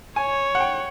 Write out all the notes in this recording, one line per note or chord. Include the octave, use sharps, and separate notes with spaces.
C#5 G#5
F#5
G5